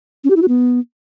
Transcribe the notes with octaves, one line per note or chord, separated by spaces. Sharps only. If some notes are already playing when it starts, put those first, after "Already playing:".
C#4
G4
E4
F#4
B3